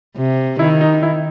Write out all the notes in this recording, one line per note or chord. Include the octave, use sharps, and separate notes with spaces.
C3
D#3 E4
D#4
E4